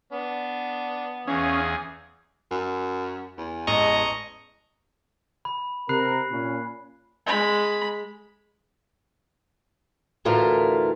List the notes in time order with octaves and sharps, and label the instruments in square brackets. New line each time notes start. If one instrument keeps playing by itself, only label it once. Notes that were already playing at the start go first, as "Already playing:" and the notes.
[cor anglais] B3 [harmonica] D4
[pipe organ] E2 G#4 [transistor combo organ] C#4 [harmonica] F5 D#6
[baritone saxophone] F#2
E2
[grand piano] A1 G#3 A5 [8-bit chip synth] D#5 A#5 C#6
[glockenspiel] B5
[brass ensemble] C3 A#4 [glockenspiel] B5 F#6 C7
[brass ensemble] A#2 C#4
[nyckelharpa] G#3 B5
[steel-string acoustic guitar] D2 A2 E3 F4 A#4 A5